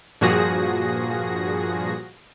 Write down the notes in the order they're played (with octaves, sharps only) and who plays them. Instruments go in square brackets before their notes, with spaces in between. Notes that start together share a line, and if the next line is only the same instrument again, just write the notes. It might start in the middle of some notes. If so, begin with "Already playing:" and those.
[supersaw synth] G2 A#2 F3 F#4 G#4 A#6